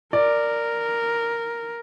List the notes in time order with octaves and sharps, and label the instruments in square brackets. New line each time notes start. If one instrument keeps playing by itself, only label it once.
[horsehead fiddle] A#4 [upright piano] D5